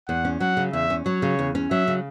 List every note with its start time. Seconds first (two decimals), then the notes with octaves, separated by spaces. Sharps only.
0.08 E2 F#5
0.25 C#4
0.40 F#3 F#5
0.57 C#3
0.73 E2 E5
0.90 C#4
1.06 F#3 C#5
1.22 C#3
1.39 E2
1.55 C#4
1.71 F#3 E5
1.88 C#3